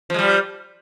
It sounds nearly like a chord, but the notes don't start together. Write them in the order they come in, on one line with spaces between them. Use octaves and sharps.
F3 G#3 G3